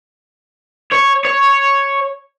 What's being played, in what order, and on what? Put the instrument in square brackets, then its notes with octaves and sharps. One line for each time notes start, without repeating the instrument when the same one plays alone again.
[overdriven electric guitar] C#5
C#5